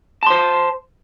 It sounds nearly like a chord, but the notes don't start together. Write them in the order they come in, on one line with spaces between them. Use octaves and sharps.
A5 C6 C5